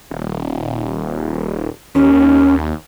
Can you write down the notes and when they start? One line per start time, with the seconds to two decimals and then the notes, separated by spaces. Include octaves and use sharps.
0.11 D#1
1.95 D#2 C#4